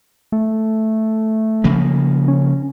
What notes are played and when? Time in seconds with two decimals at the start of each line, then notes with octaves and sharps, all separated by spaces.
0.32 A3
1.64 C#3 F3 A#3
2.28 C#4